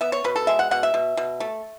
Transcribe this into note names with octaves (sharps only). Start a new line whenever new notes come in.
B3 E5
C#5
B2 B4
A4
G#3 E5
F#5
B2 F#5
E5
B2
B2
A3